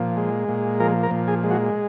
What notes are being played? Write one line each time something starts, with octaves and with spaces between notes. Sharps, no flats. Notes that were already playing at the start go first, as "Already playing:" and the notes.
Already playing: A#2 F3
G#3
A#2
F3 A#4
A#4
A#2
G#4
G#3
F#4